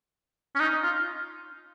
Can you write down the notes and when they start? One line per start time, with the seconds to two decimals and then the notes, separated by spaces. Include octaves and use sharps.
0.55 C#4
0.60 D#4
0.83 F4